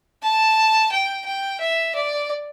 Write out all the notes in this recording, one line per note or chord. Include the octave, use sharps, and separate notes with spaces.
A5
G5
G5
E5
D5